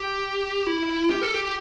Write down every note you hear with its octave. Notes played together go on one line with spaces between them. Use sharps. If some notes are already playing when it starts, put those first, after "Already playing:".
Already playing: G4
E4
G4
A4
G4